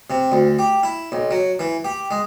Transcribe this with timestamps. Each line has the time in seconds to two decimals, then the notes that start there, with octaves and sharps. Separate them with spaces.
0.10 C3
0.32 D2
0.59 G4
0.83 E4
1.12 B1
1.31 F#3
1.59 E3
1.85 G4
2.11 G#3